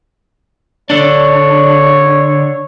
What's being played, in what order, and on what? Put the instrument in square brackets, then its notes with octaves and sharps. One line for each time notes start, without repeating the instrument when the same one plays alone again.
[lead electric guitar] D3 D4 [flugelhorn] C#5